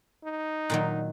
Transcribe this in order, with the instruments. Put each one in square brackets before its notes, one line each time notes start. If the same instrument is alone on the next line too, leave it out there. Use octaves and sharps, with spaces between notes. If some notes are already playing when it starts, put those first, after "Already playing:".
[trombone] D#4
[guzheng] A#2 D#3 F#3